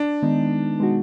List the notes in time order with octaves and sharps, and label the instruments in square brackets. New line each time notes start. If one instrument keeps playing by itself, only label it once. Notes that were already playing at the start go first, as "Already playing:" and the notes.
Already playing: [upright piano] D4
[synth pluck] D#3 G#3 B3 D#4
B2 G#3 D#4 F#4